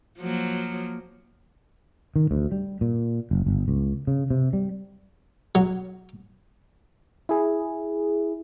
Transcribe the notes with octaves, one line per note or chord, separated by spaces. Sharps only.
F3 F#3 A#3
D#3
D2
G3
A#2
F#1
G1
C#2
C#3
C3
G3
F#3
E4 G#4